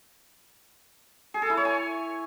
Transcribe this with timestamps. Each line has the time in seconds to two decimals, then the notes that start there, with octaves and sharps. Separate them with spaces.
1.34 G#4
1.42 A4
1.50 E4
1.57 C#5
1.65 G#5